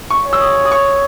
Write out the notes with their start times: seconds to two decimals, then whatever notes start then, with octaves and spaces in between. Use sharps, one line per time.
0.10 C#6
0.26 C#5
0.33 E6
0.41 D#6
0.65 D#6
0.72 C#6